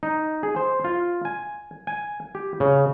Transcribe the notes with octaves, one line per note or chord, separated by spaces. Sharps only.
D#4
G#4
C5
F4
G#5
G#5
G4
C#3